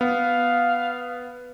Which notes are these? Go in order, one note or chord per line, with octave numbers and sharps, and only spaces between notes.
B3 F5